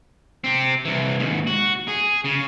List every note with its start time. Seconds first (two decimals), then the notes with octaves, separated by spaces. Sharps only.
0.44 C4 G4
0.85 C2 E3
1.19 D#2 G#2
1.47 F#4
1.88 G#4
2.25 C#3